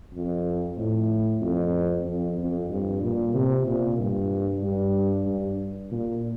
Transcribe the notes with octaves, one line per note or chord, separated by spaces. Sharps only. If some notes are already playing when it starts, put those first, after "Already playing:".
F2
A2
F2
F2
F2
G2
A#2
C3
A#2
G2
G2
G2
A#2